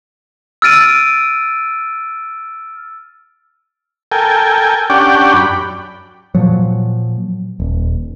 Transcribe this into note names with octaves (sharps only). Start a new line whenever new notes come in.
E6 F6 A6 D7 D#7
A4 A#4 G5 G#5
C#4 D4 G4 D5 F#5 G5
F#2 B5
A#2 F3 F#3
D#1